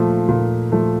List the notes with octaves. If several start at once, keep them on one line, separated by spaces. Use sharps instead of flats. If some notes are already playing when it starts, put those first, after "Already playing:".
Already playing: A#2 F3 A3
A#2
F3 A3